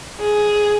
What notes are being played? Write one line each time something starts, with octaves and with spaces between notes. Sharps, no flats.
G#4